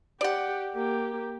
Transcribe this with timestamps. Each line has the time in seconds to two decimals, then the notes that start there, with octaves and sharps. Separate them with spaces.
0.21 G4 D5 F#5
0.76 A#3 G4